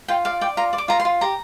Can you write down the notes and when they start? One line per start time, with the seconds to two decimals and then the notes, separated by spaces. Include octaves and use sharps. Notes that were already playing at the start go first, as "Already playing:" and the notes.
0.08 F4 G5
0.25 D5 F5
0.41 D5 G5
0.57 F4 A#5
0.73 D5
0.78 D6
0.88 F4 A#5
1.00 C6
1.05 F4
1.21 G4 A#5